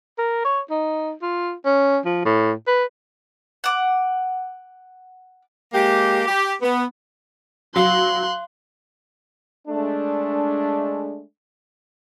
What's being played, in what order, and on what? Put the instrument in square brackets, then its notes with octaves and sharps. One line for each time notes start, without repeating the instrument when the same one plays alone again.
[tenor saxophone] A#4
C#5
D#4
F4
C#4
F3
A2
B4
[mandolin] F#5 D6
[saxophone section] G#3 A#3 G4
G4
B3
[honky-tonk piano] F#3 [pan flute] F5 [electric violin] C6 F#6
[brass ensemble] G#3 A3 D4